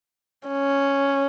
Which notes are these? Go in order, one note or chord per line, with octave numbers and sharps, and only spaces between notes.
C#4